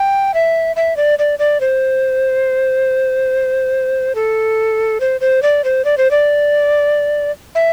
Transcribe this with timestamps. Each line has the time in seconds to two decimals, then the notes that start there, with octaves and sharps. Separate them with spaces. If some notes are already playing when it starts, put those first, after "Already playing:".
Already playing: G5
0.34 E5
0.76 E5
0.97 D5
1.19 D5
1.39 D5
1.61 C5
4.15 A4
5.00 C5
5.21 C5
5.43 D5
5.64 C5
5.85 D5
5.98 C5
6.11 D5
7.55 E5